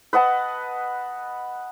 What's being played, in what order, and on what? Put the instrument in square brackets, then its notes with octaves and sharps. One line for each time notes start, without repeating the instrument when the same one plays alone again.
[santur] B4 D#5 F#5 A5